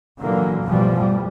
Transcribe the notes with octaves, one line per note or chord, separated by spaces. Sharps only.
A#2 D3 E3 F#3 A#3
A1 G2 B2 E3 F3 G3
F2 G3